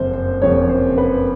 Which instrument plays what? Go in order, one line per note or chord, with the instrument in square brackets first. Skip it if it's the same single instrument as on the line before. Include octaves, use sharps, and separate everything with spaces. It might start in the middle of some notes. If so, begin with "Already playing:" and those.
Already playing: [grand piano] F#1 F2 C#3 C5
C5
F#1 F2 C#3 C#5
C5
B4